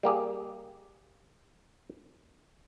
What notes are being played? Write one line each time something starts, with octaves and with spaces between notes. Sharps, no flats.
G3 A#3 G4 G#4